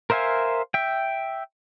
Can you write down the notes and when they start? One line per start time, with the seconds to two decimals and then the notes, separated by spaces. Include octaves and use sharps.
0.10 A#4 C5 E5 F5 G#5
0.74 E5 G5